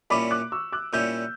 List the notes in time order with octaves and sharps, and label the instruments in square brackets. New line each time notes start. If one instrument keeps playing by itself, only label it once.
[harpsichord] A#2 G3 C#4 E4 [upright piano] B5 D6
[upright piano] D6 F#6
C#6 E6
D6 F#6
[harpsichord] A#2 G3 C#4 E4 [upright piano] E6 G6